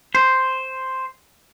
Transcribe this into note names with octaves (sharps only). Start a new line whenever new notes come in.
C5